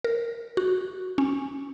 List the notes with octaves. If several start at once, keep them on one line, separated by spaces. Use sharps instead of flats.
A#4
F#4
C#4